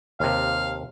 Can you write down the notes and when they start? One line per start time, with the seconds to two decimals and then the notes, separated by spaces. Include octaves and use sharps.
0.20 D#2 C3 F5